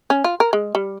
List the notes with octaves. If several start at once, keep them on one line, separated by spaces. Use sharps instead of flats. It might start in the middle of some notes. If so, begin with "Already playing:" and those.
C#4
F4
A#4
G#3
G3